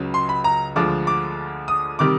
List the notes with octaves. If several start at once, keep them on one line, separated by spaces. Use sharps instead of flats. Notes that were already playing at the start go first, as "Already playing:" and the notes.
Already playing: C#2 C#3 F#3
C6
B5
A#5
D2 D3 F3 G#3 D6
D6
D#6
C3 D#3 G3 D6